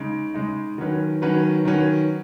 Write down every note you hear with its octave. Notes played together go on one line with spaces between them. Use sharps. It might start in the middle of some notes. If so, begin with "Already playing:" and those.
Already playing: C#3 G#3 D#4
C#3 G#3 D#4
D#3 F#3 C#4 B4
D#3 F#3 C#4 B4
D#3 F#3 C#4 B4